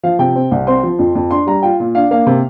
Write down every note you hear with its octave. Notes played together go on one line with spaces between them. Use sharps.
F3 F5
C3 G5
C4
C2
C4 C6
F3
F2
F2
D4 C6
G3 A#5
F4 G5
A#2
D4 F5
A#3 F5
C3